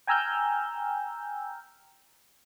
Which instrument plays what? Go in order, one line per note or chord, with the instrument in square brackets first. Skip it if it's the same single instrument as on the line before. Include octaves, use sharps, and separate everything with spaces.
[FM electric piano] G5 G#5 A#5 E6 F6 G6